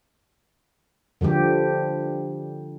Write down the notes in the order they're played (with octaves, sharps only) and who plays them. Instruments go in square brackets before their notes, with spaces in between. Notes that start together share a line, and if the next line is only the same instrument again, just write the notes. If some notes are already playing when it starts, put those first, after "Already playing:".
[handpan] D3 F3 G3 G4